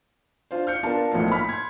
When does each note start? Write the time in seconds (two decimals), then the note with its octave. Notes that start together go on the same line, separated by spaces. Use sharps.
0.51 D4 F4 C5
0.67 F6 G6 C#7
0.83 B3 D4 F4 A#4 A5
1.12 B1 A2 F3 A#3 C#7
1.32 B5 F6 B6
1.49 C6 G#6